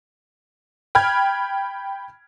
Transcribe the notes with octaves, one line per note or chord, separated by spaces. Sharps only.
G5 B5 F6 G#6